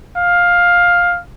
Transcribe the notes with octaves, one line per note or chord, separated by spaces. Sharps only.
F5